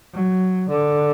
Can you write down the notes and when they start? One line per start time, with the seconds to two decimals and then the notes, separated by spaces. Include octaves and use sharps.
0.13 F#3
0.69 D3